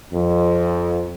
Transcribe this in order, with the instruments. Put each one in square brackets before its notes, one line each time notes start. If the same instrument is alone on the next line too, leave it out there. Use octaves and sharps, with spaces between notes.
[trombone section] F2